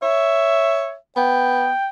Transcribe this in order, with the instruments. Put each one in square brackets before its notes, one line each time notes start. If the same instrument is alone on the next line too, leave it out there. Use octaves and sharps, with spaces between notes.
[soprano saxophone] C#5 [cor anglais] E5
[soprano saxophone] B3 [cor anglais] G5